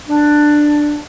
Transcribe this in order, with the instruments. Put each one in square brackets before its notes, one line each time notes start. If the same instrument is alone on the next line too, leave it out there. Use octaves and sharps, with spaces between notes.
[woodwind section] D4